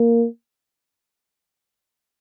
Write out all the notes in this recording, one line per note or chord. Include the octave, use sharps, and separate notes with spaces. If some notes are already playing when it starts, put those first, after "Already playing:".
Already playing: A#3